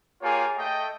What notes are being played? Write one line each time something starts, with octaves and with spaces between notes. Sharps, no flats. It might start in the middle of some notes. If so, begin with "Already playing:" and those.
A#3 F4 G4 G#4 C#5 G#5
A3 D#5 G5